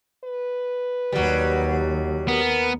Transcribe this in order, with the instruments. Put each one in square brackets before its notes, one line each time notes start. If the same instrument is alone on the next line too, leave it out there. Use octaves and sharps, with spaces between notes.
[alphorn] B4
[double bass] D#2 [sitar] F#3 G3
[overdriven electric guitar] B3 [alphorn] A#4